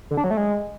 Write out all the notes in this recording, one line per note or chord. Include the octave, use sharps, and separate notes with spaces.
D3
D4
F#3
A3
G#3